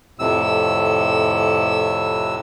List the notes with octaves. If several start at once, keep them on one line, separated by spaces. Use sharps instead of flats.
F2 A2 C3 E6